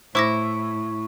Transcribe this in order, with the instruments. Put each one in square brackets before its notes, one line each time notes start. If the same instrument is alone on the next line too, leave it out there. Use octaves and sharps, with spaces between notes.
[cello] A2 [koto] E4 [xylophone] C5 D6 A#6 [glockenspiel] C#6